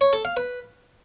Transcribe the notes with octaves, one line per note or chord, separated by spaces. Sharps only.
C#5
A4
F5
B4